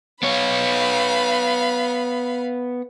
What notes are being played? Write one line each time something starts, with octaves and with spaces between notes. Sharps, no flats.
B3 C#5 F5 B5